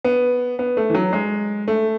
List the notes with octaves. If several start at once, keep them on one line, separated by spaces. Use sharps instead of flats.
B3
B3
A3
E3
F#3
G#3
A3